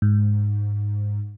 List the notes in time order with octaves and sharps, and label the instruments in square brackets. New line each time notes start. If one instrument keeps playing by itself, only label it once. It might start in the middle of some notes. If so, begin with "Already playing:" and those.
[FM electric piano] G#2